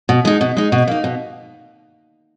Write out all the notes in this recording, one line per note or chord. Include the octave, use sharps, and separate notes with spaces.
B2
G#3 D#4
B2
G#3 D#4
B2
A#3 D#4
B2